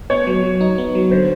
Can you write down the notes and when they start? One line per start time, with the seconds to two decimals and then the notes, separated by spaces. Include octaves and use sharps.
0.10 B3 C#5
0.27 F#3
0.43 F#3
0.61 D#4
0.78 B3
0.95 F#3
1.11 D3 C5